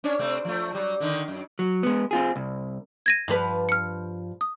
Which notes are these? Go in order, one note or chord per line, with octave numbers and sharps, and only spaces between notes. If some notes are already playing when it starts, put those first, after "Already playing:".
C#4 D4 C#5
C3 A3 C4
F3 A3
F#3 G3
D3 D#3
F#2
F#3
G#3 B3
C4 F4 G#4
C2
G#6 A#6 D#7
G2 F3 B4
F6 C#7
D#6